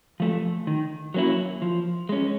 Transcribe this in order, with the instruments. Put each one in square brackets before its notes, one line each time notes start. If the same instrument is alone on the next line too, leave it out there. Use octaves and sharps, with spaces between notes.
[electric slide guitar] F3 A3
D#3
F#3 A#3 C#4 E4
F3
G#3 C#4